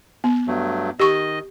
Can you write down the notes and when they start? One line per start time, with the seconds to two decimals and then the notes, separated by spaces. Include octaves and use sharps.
0.24 B3
0.47 G2 F#3 A3
1.00 D#3 G4 D#5 C#6